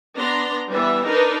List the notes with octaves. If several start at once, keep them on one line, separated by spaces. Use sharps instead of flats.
B3 D4 A#5 C6
E3 G3 B3 E5
D4 D#4 A#4 B4